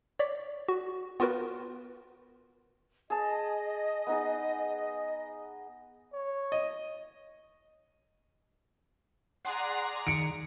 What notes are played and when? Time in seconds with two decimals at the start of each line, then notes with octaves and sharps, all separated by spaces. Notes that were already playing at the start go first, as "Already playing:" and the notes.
0.19 C#5 D5 B6
0.68 F#4
1.20 B3 F4 F#4 A#4 B4
3.10 G#4 D#5 A5
4.07 B3 D#4 G#4
6.13 C#5
6.52 D#5
9.45 G#4 D5 F#5 A#5 C6
10.07 D#3 C#7 D7